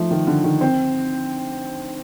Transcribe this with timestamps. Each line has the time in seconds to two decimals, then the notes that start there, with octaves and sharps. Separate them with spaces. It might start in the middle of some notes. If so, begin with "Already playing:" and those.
Already playing: F3 A3 D#4
0.11 D#3
0.27 D3
0.44 D#3
0.61 C4